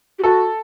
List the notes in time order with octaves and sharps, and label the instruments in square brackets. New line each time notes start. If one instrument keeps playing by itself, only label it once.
[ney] G4
[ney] F#4 [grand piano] A4